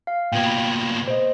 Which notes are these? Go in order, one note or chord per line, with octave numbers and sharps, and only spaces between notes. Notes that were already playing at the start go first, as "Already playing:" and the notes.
F5
A#2 B3 G5 G#6
B5
C5 D#5